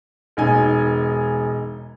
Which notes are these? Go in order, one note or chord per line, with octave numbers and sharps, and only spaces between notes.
E1 D#4 G#5